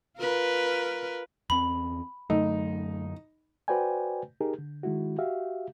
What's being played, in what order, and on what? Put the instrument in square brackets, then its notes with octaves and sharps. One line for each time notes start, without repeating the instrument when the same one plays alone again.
[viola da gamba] F4 A#4 B4
[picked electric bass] E2 C4 [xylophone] B5
[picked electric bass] F#2 D3 F#3 [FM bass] A3 [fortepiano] D#4
[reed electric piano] F#4 B4 C5 D5 G5 G#5
D#4 G4 G#4 A#4
D3
D#3 G#3 E4 F#4
F#4 G4 E5 F5